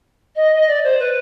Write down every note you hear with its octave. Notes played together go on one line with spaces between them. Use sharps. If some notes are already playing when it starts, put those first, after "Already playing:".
D#5
D#5
D5
C5
B4